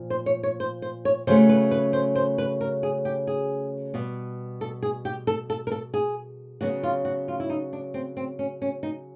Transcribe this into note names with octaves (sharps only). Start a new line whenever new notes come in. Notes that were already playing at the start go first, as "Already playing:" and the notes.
Already playing: A#2 F3
C5
C#5
C#5
C5
C5
C#5
C#3 F#3 A3 C5
B4
B4
C5
C5
B4
A#4
G#4
G4
G#4
B2 G3 B3
A4
G#4
G4
A4
A4
A#4
A4
G#4
C#3 F#3 B3 F#4
F4
F#4
F4
E4
D#4
D4
C4
C4
C#4
C#4
D#4